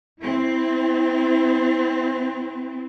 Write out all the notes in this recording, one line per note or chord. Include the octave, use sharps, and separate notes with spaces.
C4 E4